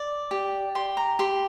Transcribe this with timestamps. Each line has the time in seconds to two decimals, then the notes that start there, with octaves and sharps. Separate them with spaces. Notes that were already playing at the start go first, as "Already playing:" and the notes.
Already playing: D5
0.31 G4
0.75 G4 C6
0.97 A#5
1.19 G4 C6